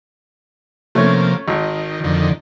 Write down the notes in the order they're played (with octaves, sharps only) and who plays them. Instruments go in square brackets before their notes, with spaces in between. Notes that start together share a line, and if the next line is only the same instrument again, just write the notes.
[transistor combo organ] C3 F3 A#3 [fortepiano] A3 C#4 C#5
[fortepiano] G#1 [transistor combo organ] D#3
[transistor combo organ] F2 D3 D#3